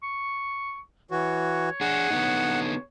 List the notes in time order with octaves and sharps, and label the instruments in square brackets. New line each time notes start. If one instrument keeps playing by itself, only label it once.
[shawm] C#6
[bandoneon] E3 F#4 [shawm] C#5
[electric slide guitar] D4 G#4 [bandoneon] F#5
[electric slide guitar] D3 B3 D#4